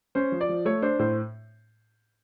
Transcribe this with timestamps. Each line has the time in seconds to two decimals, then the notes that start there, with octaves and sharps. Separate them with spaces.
0.15 C#4 C5
0.32 F3
0.41 D5
0.49 F3
0.65 A3 C#5
0.82 D4 C5
0.99 A2 C5